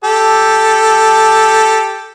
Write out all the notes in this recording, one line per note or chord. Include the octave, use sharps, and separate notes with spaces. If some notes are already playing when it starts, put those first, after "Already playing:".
G4 A4